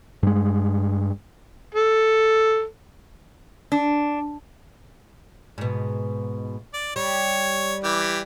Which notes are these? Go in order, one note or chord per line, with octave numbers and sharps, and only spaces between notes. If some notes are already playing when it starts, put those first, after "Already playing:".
G2 G#3
A4
D4
G#2 B2
D5
G3 C#5
E3 G4